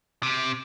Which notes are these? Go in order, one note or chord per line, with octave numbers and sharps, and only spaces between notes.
C3